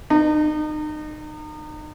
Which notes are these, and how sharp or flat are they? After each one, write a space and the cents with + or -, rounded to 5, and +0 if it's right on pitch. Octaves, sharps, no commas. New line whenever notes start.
D#4 -35